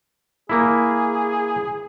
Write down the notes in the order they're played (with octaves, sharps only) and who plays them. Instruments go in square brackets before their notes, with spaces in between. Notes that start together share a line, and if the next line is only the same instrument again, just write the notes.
[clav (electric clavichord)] A#3 E4 [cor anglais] G#4